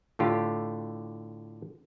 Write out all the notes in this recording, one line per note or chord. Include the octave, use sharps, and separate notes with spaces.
A2 D3 F4 G4